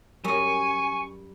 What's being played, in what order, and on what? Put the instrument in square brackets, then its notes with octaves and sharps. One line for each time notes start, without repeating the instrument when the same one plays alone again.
[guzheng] F#2 [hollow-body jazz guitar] G3 [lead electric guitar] G#5 [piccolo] C#6